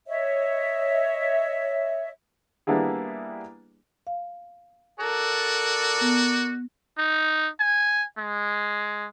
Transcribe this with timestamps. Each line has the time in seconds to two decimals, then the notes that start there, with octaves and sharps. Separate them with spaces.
0.08 C#5 D#5 E5
2.67 G3 A#3 B3 D4 E4 G#4
4.07 F5
5.00 F#4 A4 A#4 D5
6.01 B3
6.98 D#4
7.60 G#5
8.18 G#3